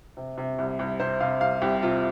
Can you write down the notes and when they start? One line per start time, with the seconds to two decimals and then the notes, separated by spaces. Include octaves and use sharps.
0.17 C3
0.38 C3
0.58 C2
0.79 C2
1.00 C3 C5
1.20 C3 F5
1.41 C2 F5
1.62 C2 G4
1.82 C3 F4